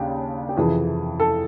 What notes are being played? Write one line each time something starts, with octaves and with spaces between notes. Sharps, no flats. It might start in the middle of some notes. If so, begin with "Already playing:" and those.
Already playing: D#2 C#3 D4 G4
G4
F2 C3 E3 G#4
A4